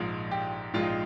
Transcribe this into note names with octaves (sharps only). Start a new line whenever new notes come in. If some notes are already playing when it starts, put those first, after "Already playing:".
Already playing: A#1 G#2 F3 G#3
G4
A#1 G#2 F3 G#3 F4
D#4